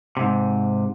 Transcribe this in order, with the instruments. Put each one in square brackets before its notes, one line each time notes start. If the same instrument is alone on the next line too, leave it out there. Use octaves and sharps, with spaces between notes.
[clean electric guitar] G#2 C3